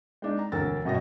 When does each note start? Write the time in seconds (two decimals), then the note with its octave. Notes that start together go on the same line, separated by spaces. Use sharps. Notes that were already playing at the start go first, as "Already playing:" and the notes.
0.22 G#3 D4 D#4
0.39 A#5
0.52 E1 D2 A#4 E6 A6
0.85 F#2 B2 F#4 D#5 G5 A#6